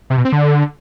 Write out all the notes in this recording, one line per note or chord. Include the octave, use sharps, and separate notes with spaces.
C3
B2
C4
D3